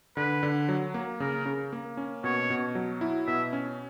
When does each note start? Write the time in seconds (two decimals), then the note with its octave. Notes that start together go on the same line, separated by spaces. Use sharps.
0.17 D3 B4
0.43 D3
0.69 F#3
0.94 A#3
1.20 C#3 A#4
1.46 C#3
1.73 A#3
1.97 C#4
2.24 B2 C#5
2.50 B2
2.75 F#3
3.01 E4
3.27 B2 E5
3.53 C#4